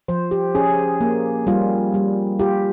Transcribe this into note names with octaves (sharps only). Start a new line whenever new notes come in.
F3 C5
G4
C#4 G#4
A#3
G3 F4
G3
F4 G4